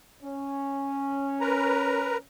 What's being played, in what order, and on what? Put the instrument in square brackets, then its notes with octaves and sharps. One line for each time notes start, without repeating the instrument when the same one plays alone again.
[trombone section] C#4
[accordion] A#4 B4 A#5